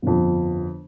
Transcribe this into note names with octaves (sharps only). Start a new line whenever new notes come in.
G1 F2